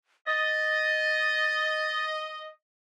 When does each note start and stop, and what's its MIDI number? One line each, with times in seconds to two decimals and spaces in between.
0.27 2.47 75
0.27 2.05 93